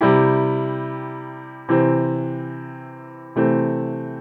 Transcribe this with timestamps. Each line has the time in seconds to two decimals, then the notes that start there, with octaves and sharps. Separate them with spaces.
0.01 C3 G3 E4 G4
1.69 C3 E3 C4
3.36 C3 E3 A3 C4